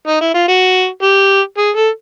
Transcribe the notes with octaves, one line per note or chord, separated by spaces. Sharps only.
D#4
E4
F4
F#4
G4
G#4
A4